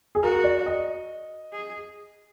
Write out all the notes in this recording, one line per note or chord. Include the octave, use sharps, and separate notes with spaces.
G#4
F#4 A#4
D5
D#5
G#4